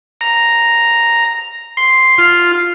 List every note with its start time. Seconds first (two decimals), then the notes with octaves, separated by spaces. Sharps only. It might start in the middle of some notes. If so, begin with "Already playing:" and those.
0.21 A#5
1.77 C6
2.18 F4